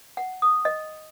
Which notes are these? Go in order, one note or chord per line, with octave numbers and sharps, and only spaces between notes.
F#5
D#6
D#5